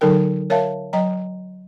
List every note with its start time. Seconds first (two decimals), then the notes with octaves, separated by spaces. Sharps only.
0.01 D3 F#3 D#4 A4 A#4 G5
0.50 A#4 C#5 E5 F5 A5
0.93 F#3 D#5 G5 A#5